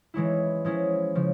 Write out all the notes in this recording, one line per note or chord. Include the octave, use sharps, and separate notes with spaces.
E3 G#3 C#4 E4
F3 G#3 C#4 E4
C#3 F3